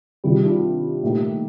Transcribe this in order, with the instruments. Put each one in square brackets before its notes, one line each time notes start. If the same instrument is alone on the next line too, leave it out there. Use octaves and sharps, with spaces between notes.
[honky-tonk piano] C3 D#3 G3 [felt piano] F4
[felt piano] G4
D4 F4
[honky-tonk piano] A#2 A3 D#4 G4